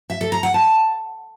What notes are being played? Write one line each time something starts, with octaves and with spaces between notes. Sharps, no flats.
E5
A4
A#5
F#5
A5